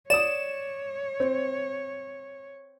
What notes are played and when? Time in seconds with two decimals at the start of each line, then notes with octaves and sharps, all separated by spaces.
0.10 C#5 D5 D#6 E7
1.20 C4